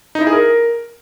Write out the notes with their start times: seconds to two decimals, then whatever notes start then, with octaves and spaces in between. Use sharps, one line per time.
0.15 D#4
0.21 E4
0.27 G#4
0.33 A#4